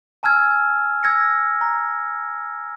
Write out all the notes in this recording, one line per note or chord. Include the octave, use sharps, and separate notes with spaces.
G#5 A5 E6 F6 G#6
E6 G#6 A#6 C#7
A#5